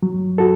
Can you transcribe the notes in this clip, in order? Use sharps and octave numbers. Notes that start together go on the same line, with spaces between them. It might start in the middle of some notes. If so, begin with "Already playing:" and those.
F#3
F#4 A4